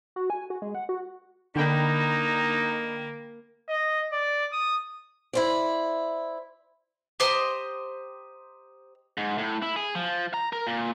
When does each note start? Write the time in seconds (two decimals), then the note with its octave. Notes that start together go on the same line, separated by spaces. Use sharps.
0.16 F#4
0.30 G#5
0.50 F#4
0.62 G#3
0.75 F#5
0.89 F#4
1.56 D3 A#3 D#4 G5 B5
3.69 D#5
4.12 D5
4.53 D#6
5.33 E4 C5 D5
7.20 G4 C5 D#5 A#5
9.18 G#2
9.38 A2
9.62 E4
9.76 G#4
9.95 F3
10.34 A#5
10.53 A#4
10.67 A#2